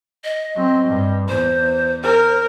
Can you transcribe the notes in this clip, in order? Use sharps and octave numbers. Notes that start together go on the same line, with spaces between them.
D#5
F#3 C4
G2
E2 C5
A#4 C5